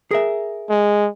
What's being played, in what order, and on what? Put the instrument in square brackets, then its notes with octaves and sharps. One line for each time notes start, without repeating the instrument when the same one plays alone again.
[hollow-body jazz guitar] G#4 A#4 E5
[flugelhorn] G#3